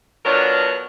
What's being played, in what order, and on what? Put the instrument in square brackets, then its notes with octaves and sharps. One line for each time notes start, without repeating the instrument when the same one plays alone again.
[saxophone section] B2 F#3 B3 D4 F4 A#4